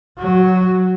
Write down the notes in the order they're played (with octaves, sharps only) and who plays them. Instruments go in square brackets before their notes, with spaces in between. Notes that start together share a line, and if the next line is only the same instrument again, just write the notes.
[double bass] F#3